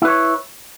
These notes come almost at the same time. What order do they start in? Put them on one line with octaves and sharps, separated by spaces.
E4 B4 C#5